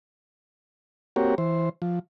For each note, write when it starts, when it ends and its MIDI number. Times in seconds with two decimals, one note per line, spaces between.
1.16 1.35 58
1.16 1.35 60
1.16 1.35 66
1.16 1.35 67
1.16 1.35 70
1.16 1.35 73
1.38 1.69 52
1.38 1.69 72
1.82 1.99 53